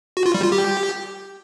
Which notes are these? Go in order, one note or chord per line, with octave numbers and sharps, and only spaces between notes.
F#4
F4
G3
F4
G4